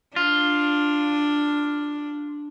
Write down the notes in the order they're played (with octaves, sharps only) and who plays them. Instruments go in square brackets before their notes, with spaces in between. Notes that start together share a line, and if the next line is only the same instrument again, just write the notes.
[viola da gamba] D4 [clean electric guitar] F4